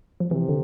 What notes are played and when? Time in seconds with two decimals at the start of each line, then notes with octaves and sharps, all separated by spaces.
0.20 F3
0.31 C3 E3
0.49 D3